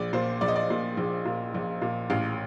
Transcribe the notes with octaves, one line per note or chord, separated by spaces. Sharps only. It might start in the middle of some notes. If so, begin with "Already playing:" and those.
Already playing: A#1 D5
A#2 C5
A#1 D5
D#5
D5
A#2
A#1
A#2
A#1
A#2
A1 F5